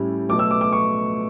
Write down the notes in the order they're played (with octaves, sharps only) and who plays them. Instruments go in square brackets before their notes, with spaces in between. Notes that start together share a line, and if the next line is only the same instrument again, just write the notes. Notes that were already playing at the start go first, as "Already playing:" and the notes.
Already playing: [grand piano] A2 G3 C#4 E4
B2 F#3 A3 D6
E6
D6
D6
C#6